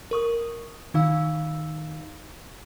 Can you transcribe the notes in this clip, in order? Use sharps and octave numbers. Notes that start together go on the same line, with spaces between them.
A#4 C#6 D#6
D#3 D#4 F5 E6